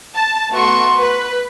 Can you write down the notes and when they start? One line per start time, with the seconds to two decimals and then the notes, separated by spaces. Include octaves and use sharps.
0.15 A5
0.51 A3 B3 F#4 C6 C#6
0.98 B4